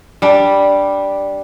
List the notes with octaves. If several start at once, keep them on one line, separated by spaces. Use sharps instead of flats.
G3 D4